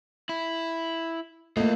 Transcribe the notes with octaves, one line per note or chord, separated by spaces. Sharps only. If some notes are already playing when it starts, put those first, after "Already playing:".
E4
A3 A#3 F4 D#5